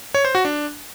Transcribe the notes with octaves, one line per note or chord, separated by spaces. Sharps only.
C#5
C5
F#4
D4